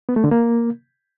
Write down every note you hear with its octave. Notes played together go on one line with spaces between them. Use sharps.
B3
A3
D3
A#3